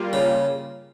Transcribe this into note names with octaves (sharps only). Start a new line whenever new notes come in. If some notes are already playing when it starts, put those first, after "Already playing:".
Already playing: G3 A#3 F4
C#3